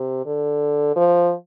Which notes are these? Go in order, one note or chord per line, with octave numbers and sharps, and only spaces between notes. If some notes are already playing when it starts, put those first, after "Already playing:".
Already playing: C3
D3
F3